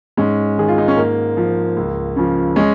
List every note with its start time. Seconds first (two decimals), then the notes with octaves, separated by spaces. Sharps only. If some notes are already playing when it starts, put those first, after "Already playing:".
0.17 G#2 G#3 C#4
0.57 D#3 G#4
0.68 F4
0.78 D#4
0.88 C#4
0.97 G#2 A#3
1.37 F3
1.76 C#2
2.16 C#3 F3
2.56 G#3 C#4